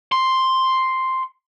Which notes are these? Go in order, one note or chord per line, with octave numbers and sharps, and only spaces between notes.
C6